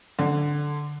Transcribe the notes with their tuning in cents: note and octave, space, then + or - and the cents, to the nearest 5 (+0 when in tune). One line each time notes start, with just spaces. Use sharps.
D3 +0